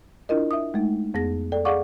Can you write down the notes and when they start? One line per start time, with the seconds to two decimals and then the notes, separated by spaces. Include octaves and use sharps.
0.29 D4 E4 F4 A#4 D#5
0.51 E5 D#6
0.74 G#3 A3 D#4
1.14 F2 B3 G#4 A#6
1.52 A4 D5 G5
1.65 G#4 D5 F5 F#5 C#6 D6